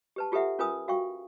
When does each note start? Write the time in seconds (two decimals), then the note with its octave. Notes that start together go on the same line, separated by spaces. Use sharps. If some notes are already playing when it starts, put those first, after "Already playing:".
0.16 G4 B4 A5
0.32 F4 G4 A4 B4 E5 F#5
0.59 C#4 F4 A#4 B4 G#5 D#6
0.88 F#4 F5 G5 C#6